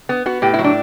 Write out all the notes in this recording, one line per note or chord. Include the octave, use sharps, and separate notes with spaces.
B3
B3 F#4
A2 G4
E4
F#3
D4